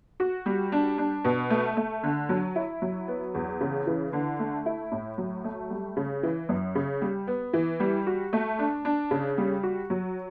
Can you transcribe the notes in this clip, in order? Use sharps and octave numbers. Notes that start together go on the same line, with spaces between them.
F#4
G3
D4
D4
B2
A3
A3
D3
F#3
E4
F#3
B3
E2
C#3
E3
D3
A3
E4
A2
F#3
A3
G3
C#3
E3
F#2
C#3
G3
B3
E3
G3
F#4
A3
D4
D4
C#3
G3
F#4
F#3